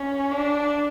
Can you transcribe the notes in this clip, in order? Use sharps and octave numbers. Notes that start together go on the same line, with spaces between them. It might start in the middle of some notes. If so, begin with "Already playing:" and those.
Already playing: C#4
D4